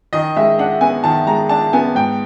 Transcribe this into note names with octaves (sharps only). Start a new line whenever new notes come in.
D#3 D#5
G#3 E5
D4 F#5
B3 G#5
D#3 A5
G#3 A#5
D4 A5
B3 G#5
G#2 G5